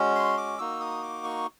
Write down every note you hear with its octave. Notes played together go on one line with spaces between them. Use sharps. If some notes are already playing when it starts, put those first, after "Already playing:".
Already playing: G#3 C#4 F#4
C6
D6
A#3 D#4 F#4 E6
D#6
D6
C#6